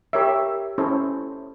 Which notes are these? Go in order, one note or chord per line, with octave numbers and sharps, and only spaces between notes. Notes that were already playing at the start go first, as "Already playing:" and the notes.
G4 A#4 C#5 E5
C#4 E4 A4 C5